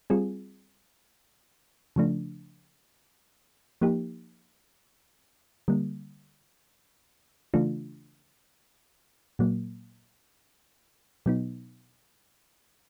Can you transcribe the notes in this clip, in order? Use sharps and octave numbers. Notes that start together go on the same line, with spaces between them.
G3 C4 F4 G#4
C#3 F3 A3 D4
F3 A#3 D#4 G4
D3 G3 A#3
C#3 E3 A3 D4 F4
A#2 F#3 A#3
B2 F#3 B3 D#4